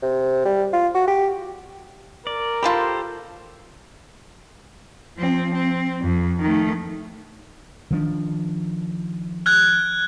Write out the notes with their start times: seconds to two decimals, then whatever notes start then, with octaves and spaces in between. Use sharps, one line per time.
0.02 C3
0.45 G3
0.73 F4
0.95 F#4
1.08 G4
2.27 A#4 D5
2.63 F4 G4 A4 C5 A5 B5
5.17 F3 C4
5.54 C4
6.01 F2
6.41 D#3 A3
7.91 D#3 F3 D4
9.46 F6 F#6 G#6